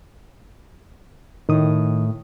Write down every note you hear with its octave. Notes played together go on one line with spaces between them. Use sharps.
A2 D#3 D#6